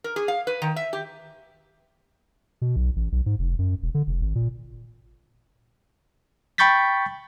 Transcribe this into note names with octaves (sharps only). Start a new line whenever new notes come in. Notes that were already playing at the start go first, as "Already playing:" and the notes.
A#4
G#4
F5
B4
D#3
E5
G4
B2
B1
A1
B1
G#2
F1
F#2
E1
D3
F1
G#1
A#2
G5 B5 C#6 G6 A6 B6